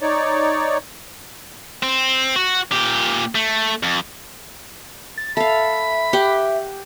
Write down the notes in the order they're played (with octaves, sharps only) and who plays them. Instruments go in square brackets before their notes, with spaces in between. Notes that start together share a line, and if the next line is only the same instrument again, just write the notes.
[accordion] D#4 C#5 D5
[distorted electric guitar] C4
F#4
A#2 G4
A3
F2
[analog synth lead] A6
[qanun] A4 F5 [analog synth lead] E5 [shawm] B5
[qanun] G4 F#5 G5